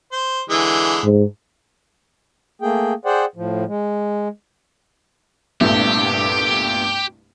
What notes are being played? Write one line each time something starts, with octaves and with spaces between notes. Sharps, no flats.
C5
D3 E3 G#3
G#2
A3 A#3 G#4 G5
G#4 C5 D5 F#5 G5
A2 F3
G#3
C2 G2 A#2 A3 B3 G4